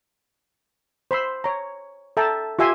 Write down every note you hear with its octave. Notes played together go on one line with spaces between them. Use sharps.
C5 B5 C6 E6
C#5 A#5
A4 E5 G5 A5 A#5
F4 G4 E5 G#5 C6